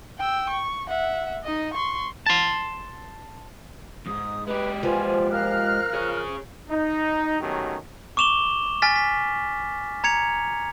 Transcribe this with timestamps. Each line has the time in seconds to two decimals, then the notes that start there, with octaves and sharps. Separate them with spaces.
0.18 G5 E6
0.50 C#6
0.88 E5 F#5
1.44 D#4 D#5
1.74 C6 C#6
2.26 A5 C6
4.06 E2 G#2 D#6
4.47 G#3 G4 B4
4.83 F3 B3 F4 G#5
5.31 A#4 F5 F6 F#6
5.93 G#4 C#5
6.69 D#4
7.41 B2 D#3 F#3 A3 C#4 G4
8.17 C#6 D6 E7 F7 G7
8.82 G#5 F6 A6 B6
8.96 B6
10.04 A#5 G#6 C#7 F7